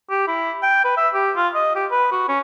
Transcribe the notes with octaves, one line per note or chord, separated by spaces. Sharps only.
G4
E4
G5
B4
E5
G4
F4
D#5
G4
B4
F#4
C#4